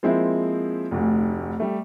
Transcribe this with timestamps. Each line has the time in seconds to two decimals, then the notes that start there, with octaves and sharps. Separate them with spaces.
0.03 F3 G#3 A#3 C4 E4
0.91 F1 D2
1.60 G3 A3